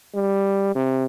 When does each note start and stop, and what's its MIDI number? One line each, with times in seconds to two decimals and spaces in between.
0.15 0.75 55
0.75 1.05 48